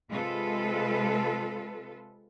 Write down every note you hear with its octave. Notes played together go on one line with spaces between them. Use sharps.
C3 G#3 F4 A4 B4